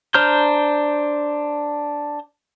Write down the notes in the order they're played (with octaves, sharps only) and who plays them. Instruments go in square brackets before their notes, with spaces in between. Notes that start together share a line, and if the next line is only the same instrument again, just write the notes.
[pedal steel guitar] D4 C5 A#5 F6 G6